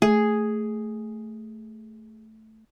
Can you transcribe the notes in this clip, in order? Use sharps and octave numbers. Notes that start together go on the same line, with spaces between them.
A3 G#4